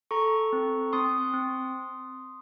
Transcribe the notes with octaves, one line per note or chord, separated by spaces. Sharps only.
A4 A#5 C#6
C4
C4 C6 D#6
C4